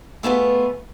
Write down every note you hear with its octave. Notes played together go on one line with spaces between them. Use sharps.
A3 B3 F4 G#4